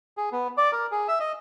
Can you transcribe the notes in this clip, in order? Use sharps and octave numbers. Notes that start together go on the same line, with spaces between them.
G#4
B3
D5
A#4
G#4
E5
D#5